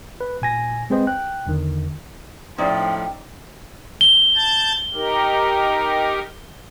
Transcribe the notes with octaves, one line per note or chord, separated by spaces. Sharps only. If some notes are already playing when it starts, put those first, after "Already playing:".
B4
A#2 G#5 A#6
G#3 C4 G#4 B4 C5 D#5
G5 F#6
E2 D3 D#3
A2 F3 C#4 D#4 C5 D5 G5
G7
A5 G6 A6
D#4 G4 A#4